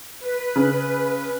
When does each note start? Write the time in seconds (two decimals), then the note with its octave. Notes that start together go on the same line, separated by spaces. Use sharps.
0.20 B4
0.56 C#3